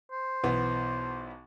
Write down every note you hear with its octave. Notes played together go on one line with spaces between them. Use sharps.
C5
B1 E3 B3